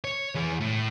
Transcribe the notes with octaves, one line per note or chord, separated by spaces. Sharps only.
C#5
E3 G#4
A2